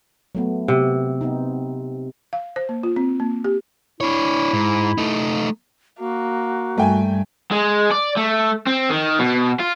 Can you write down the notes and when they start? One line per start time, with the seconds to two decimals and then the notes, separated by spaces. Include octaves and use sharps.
0.35 F#3 A3 B3
0.68 C3 B3 F#4
1.21 B3 C4 D#4
2.33 F5
2.56 C5
2.69 A#3
2.83 F4
2.96 C4
3.20 A#3
3.44 G4
4.01 D4 E4 C#5
4.53 G#2
4.98 A3 D#4
5.99 A#3 F#4
6.78 G2 A3 G5 G#5
7.52 G#3
7.92 D5
8.17 A3
8.67 C4
8.90 D#3
9.19 B2
9.60 F4